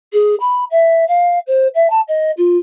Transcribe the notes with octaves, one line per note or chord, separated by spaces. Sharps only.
G#4
B5
E5
F5
C5
E5
A5
D#5
F4